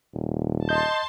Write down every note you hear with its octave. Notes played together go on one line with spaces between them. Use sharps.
D#1
D#5 A5 C6 G6